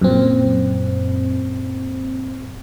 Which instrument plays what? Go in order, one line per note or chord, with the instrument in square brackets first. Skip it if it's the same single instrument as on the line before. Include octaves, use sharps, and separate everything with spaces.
[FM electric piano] F#2 A#2 C4